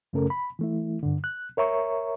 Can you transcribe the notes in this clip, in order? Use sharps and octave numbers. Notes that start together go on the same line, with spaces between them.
F#2 C#3 A3 C#4 A4 A#4
B5
E3 A3 E4
G2 D3
F#6
A#4 C#5 E5 A#5 C#6